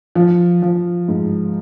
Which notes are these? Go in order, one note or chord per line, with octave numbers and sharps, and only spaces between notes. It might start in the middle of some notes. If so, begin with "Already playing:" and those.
F3
F3
G#2